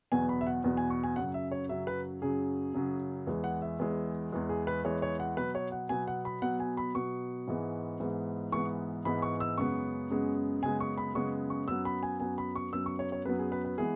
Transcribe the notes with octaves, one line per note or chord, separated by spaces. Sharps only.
E2 B2 F#3 B3 G#5
B5
E5
F#5
E2 B2 F#3 B3
G#5
C#6
G#5
F#2 C#3 F#3 F#5
E5
C#5
F#2 C#3 F#3 E5
B4
F#2 C#3 F#3 G#4
F#2 C#3 F#3
E2 E3 G#3
F#5
E5
E2 E3 G#3
E2 E3 G#3
G#4
B4
E2 E3 G#3 C#5
C#5
F#5
B2 F#3 B3 B4
C#5
F#5
B2 F#3 B3 G#5
F#5
B5
B2 F#3 B3 F#5
G#5
B5
B2 F#3 B3 C#6
G#2 E3 G#3 B3
G#2 E3 G#3 B3
G#2 E3 G#3 B3 C#6
G#2 E3 G#3 B3 B5
C#6
E6
F#2 C#3 G#3 B3 C#6
F#2 C#3 G#3 B3
F#2 C#3 G#3 B3 G#5
C#6
B5
F#2 C#3 G#3 B3 C#6
C#6
F#2 F#3 B3 E6
B5
G#5
F#2 F#3 B3 G#5
B5
C#6
F#2 F#3 B3 E6
C#6
C#5
C#5
F#2 F#3 B3 B4
G#4
B4
B4
E3 G#3 B3 G#4